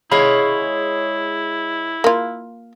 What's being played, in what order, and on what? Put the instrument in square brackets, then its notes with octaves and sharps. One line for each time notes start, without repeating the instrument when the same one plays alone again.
[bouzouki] G#3 C#5 [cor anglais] E4 [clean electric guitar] G#4 F5 B5
[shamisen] A#3 F4